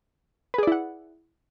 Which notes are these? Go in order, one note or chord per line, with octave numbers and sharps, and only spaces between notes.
E4 G#4 B4 D5 F#5